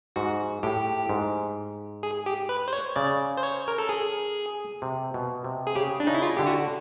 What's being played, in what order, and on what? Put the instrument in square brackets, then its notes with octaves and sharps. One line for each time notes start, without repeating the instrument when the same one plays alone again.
[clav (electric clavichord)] G#2 [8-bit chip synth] F#4
[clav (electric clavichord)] A2 [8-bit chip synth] G4
[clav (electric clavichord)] G#2
[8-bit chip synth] G#4
G4
B4
C5
C#5
[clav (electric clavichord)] C#3 [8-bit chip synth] D5
[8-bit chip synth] C5
C#5
A#4
A4
G#4
[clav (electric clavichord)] C3
B2
C3
[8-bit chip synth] G#4
[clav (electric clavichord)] C#3 [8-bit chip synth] G4
[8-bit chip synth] D4
[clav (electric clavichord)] C#3 [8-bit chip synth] D#4
[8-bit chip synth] E4
F4
[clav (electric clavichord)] D3 [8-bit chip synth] G4
[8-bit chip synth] F#4